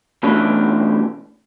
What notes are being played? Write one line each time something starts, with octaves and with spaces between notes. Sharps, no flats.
B2 E3 A3 C#4 D4